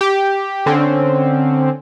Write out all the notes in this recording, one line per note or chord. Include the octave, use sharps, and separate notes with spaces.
G4
D3 C4 C#4